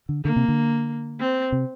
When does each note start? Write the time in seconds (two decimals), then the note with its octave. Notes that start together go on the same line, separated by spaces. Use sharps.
0.09 D3
0.25 D3 A#3
0.36 C3
0.48 D3
1.20 C4
1.52 C3